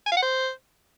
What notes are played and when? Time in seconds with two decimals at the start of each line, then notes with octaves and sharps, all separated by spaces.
0.07 G#5
0.12 F5
0.17 F#5
0.22 C5